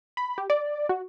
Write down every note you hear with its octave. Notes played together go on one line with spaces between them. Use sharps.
B5
G4
D5
F#4